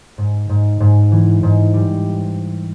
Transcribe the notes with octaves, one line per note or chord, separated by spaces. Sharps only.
G#2
G#2
G#2
E3
G#2
G3